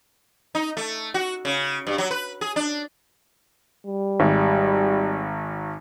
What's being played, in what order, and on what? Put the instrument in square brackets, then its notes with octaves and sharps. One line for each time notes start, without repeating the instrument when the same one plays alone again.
[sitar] D#4
A3
F#4
C#3
G2
F#3
B4
G#4
D4
[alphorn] G3
[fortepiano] G#1